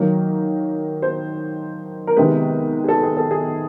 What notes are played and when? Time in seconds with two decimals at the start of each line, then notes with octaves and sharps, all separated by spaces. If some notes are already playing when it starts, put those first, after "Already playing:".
Already playing: D#3 F#3 A#3
1.02 C5
2.07 A#4
2.16 C3 D#3 G#3 B3 B4
2.84 G#4
2.89 A4
3.03 G#4
3.17 A4
3.31 G#4